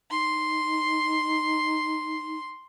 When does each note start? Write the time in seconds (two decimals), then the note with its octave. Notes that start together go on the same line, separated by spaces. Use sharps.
0.11 D#4 C6